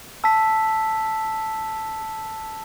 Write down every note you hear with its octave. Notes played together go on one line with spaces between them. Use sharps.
A5 E6 B6